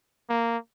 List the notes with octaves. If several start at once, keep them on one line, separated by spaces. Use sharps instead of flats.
A#3